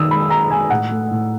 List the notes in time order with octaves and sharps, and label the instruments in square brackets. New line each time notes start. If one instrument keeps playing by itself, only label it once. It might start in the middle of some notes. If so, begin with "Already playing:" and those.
Already playing: [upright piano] D#3 D#4 D#6 E6
G#3 B5
G#3 A#5
G#3 G#5
A2 F#5
A3
A2